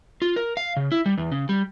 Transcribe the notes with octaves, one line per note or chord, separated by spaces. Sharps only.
F4
A#4
F5
C#3
E4
G3
E2
C#3
G3